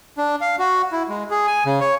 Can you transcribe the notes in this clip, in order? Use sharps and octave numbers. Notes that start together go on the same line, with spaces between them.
D4
F5
F#4
E4
G#3
G#4
G#5
C#3
C#5